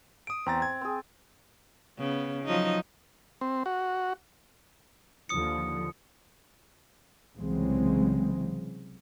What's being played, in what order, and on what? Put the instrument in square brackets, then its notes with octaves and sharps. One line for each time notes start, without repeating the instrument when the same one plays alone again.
[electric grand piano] D#6 D7
[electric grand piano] E2 A#5 A6 [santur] C4
[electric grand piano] G#6
[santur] C4 G#4
[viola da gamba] C#3 B3
F3 F#3 D#4
[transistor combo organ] C4
F#4
[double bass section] D#2 D3 F3 [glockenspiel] D#6 C#7
[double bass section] C2 C#3 E3 F#3 G#3 C4